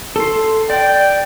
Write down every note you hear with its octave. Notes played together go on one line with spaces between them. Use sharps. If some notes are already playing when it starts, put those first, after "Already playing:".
A4 C6
D5 G5